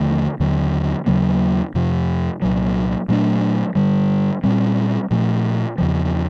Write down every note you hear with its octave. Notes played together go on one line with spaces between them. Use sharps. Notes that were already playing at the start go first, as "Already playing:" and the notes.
Already playing: D#2 D3 F3 A3
D#2 D3 F#3
D#2 C#3 F#3 A#3
F2 C3 F3
C2 A#2 F#3
A#2 F#3 A3 D4
G2 D3 G3
A#2 G3 C4
A#2 F3 A3
E2 C#3 F3